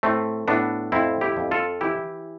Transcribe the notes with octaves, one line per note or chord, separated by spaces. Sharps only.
A2 A3 C4
A2 B3 D4
F2 C4 E4
E4 G4
F2
F4 A4
E3 E4 G4